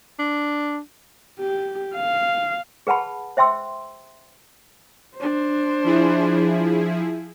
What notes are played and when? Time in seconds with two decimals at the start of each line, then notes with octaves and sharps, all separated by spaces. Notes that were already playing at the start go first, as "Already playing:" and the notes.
0.19 D4
1.40 G4
1.95 F5
2.87 G#4 B4 F#5 A5 B5
3.37 C5 E5 G5 C6 E6
5.17 D4 C5
5.84 F3 E4 G#4